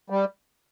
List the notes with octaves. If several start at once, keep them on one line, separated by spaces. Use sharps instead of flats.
G3